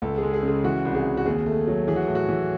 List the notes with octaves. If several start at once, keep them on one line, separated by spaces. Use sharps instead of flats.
C#2 A4
G#3 G#4
G#4
C#3
G#4
E3 F#4
C2
G#4
C2
F#4
D#2 G#4
A3
F#3
E3 G#4
F#4
A2
F#4
E3